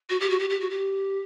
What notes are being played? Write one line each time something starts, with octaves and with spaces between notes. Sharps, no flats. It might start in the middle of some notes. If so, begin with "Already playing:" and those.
F#4
G4
F#4
G4
G4
F#4
G4